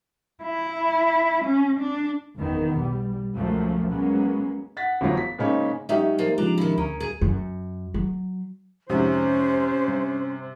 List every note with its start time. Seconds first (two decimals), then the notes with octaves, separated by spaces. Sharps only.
0.43 E4
1.44 C#4
1.79 D4
2.37 F#1 E2 D#3 B3
2.79 B1 G3
3.36 C#2 F#2 F3 F#3 A3 A#3
3.92 F#3 G#3 A#3 B3 C#4
4.77 F#5 A6 B6
5.01 G1 D2 F3 F#3
5.17 B6
5.38 G#2 C#3 A#3 C#4 D#4
5.89 G#2 F#3 C#4 D#4 G4 E5 F5
6.18 F3 A#3
6.38 C#3 F3 G#3 D4 A#5
6.58 D#3 E4
6.78 D2 C#4 A#4
7.00 G#4
7.21 F#2
7.94 F#3
8.90 F2 G#2 C3 C#4 C5 E5
9.88 G2